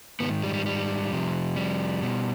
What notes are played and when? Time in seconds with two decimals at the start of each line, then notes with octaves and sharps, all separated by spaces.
0.20 G#2 D#3 B3
0.44 G3
0.54 G3
0.66 G3
1.11 F2 C3 F3
1.56 G3
2.02 B2